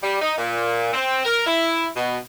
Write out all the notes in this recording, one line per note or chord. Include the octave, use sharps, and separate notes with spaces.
G3
D#4
A#2
C4
A#4
E4
B2